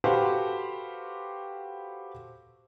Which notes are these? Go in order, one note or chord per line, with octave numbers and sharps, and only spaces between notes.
F#4 G4 A4 B4 C5 F5